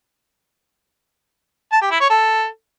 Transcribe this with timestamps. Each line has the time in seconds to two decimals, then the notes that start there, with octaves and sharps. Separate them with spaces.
1.72 A5
1.82 G4
1.91 E4
2.01 C#5
2.10 A4